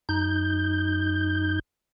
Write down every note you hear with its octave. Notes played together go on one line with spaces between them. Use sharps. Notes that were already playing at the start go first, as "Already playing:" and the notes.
F#2 D#4 G6